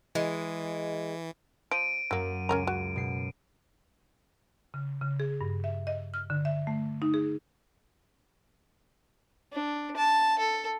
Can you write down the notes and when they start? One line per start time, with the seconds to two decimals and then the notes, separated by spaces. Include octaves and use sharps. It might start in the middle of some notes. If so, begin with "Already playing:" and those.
0.15 E3 G#3
1.71 F3 D7 D#7
2.11 F#2 F#3 A#3
2.49 C#2 C#4 A#4 A#5
2.67 F#4
2.96 B2 C7
4.74 C#3
5.02 C#3
5.20 G#4
5.41 G2
5.64 E5
5.87 D#5
6.14 F6
6.30 D3
6.45 E5
6.67 A3
7.02 D#4
7.14 G#4
9.53 D4
9.97 A5
10.39 A4